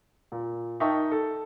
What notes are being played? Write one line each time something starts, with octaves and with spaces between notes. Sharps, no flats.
A#2
D#4 A#4 E5 G5 A5 C#6
A4